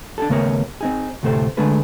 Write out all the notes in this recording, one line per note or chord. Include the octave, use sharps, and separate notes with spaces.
D4 G#4 A4
D#2 C#3 A3 B3 A#4 C#5
C4 D#4 G#4
D2 A2 C3 A3 A4 C5
D3 G#3 A3 D4 G#4 B4